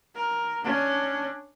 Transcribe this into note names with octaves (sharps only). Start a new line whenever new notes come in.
A#4
C#4 D4